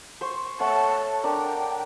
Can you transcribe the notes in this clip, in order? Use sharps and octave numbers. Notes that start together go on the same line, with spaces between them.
C5 C6 C#6
A3 C#5 F#5 A5
D4 A#4 G5